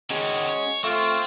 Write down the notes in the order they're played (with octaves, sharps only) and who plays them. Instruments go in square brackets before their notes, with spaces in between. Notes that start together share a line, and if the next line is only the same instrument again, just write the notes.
[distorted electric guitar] C#2 D#3 [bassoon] G#3 [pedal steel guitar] C#4 F#4 G#4
[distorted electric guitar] C#5
[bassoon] A3 [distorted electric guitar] C4 [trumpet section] F4 [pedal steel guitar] C#6